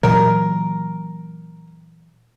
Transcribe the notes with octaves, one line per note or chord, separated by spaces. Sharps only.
A#2 E3 F#3 A#4